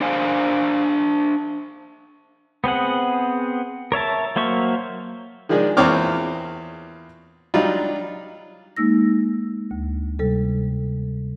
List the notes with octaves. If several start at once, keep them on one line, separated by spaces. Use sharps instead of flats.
D4 C5 F5 G#5
B3 C4 G#4 F#5
A#4 C#5 E5 A5
F#3 A#3 C5 E5 C#6
D#3 F3 G#3 D4 G#4
E2 A#2 C4 C#5 D6 F6
F#3 G3 D4 D#4 F4
G#3 A#3 D#4 E6 A#6
D2
C3 G3 A4